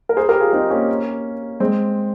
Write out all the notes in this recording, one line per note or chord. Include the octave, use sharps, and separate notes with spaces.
A#4
G#4 C5
G4 A#4
F4 G#4
C4 D#4
A#3 C#4
G#3 C4